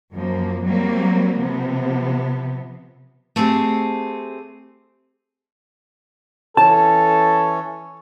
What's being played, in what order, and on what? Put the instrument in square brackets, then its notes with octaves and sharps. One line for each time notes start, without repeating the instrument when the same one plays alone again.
[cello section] F#2 F3 A#3
F#3 G3 A#3 C4
C3 F3 B3
[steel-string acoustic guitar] A3 C4 G4 G#4
[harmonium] E3 C#4 C#5 [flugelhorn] A4 [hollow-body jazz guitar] A5